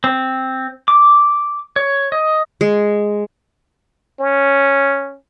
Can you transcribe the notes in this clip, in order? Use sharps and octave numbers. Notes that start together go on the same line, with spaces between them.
C4
D6
C#5
D#5
G#3
C#4